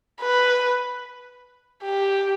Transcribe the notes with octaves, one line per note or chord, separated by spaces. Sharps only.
B4
G4